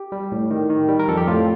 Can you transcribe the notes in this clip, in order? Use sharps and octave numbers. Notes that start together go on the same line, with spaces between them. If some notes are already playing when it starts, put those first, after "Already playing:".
Already playing: G4
G3
A2
D#3
D#3
G3
A#4
F2 A4
G4
A2 F4